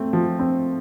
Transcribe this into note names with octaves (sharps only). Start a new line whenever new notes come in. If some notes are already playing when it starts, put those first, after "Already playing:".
Already playing: A3 C4
F3
C4